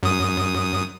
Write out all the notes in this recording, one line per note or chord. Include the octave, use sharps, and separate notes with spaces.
F#2 D#6